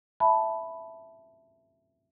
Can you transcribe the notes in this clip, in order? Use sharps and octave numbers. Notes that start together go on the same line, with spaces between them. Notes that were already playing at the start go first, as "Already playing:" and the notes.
E5 A5 B5